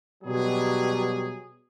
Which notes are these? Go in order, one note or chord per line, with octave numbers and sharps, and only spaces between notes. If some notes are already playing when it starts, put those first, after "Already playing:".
B2 F#3 G3 G#4